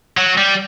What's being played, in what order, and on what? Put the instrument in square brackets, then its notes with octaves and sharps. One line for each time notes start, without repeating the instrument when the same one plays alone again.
[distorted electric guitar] F#3
G3